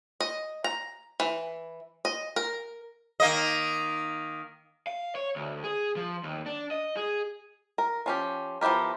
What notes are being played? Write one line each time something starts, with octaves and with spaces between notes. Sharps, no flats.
D#5
A#5
E3
D#5
A#4
D#3 A#3 D#5
F5
C#5
D2
G#4
F3
D#2
D4
D#5
G#4
A#4
F3 C#4 G4
F3 B3 E4 G4 A#4